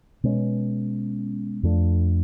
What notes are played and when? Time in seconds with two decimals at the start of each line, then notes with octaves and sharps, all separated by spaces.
0.24 B2 G#3 C#4
1.63 F2 F3 A3 D4